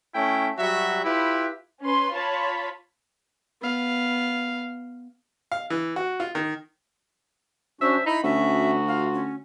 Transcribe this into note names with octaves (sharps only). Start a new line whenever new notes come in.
A3 C#4 E4 G5
F#3 G3 F#4 E5
E4 F4 G4 B4
C#4 B4 C6
F4 C#5 A5 B5
B3 F5
F5
E3
F#4
F4
D#3
C#4 D4 F#4 C5 E5
D#4 E4 B5
D2 C#4 F#4 E5
F4 F5
C#4